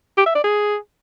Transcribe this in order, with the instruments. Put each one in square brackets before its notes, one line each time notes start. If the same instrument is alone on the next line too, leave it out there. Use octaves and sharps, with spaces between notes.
[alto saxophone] G4
E5
D5
G#4